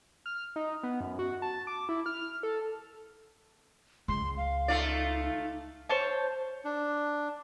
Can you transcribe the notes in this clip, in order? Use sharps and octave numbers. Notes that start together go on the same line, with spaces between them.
F6
D#4
B3
F#2
F#4
A5
D6
E4
F6
F6
A4
C#2 C6
F5
A3 D#4 F4 D5
C5 C#5 A5
D4